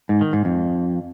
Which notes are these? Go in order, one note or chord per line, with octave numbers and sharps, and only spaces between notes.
G#2
D#3
G#2
F2